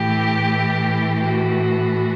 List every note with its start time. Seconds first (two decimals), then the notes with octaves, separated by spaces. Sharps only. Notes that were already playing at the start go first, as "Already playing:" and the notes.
Already playing: A2 E3 G4
1.22 F#4